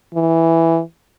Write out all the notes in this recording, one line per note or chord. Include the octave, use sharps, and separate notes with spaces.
E3